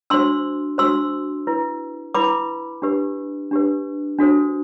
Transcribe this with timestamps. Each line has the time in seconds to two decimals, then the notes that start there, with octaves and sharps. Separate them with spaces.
0.10 D4 F#4 C5 C6 E6
0.78 D4 F#4 C5 C6 E6
1.47 E4 B4
2.14 E4 B4 B5 D6
2.82 D4 G4 B4
3.51 D4 G4 B4
4.19 D4 F#4 A4 C5